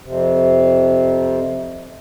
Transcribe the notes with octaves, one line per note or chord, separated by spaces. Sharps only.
F2 C3